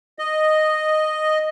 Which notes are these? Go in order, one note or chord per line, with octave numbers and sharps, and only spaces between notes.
D#5